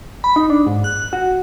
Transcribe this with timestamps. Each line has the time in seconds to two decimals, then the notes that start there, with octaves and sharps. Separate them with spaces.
0.24 B5
0.36 D#4
0.50 D4
0.67 G#2
0.84 F#6
1.13 F#4